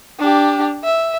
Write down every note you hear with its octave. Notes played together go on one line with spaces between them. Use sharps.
D4 G4
E5